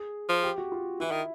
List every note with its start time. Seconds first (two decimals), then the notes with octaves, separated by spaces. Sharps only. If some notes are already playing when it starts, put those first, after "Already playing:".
Already playing: G#4
0.29 F3
0.43 G4
0.58 F#4
0.72 F4
1.00 E3 E4
1.11 D#3